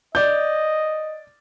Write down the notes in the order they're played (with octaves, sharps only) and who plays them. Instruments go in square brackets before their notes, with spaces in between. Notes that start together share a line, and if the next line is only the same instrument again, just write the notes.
[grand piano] D5 G6 [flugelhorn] D#5